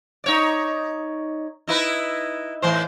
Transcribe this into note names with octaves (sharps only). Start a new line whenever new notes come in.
D#4 C#5 D5
D#4 E4 B4
A2 E3 C5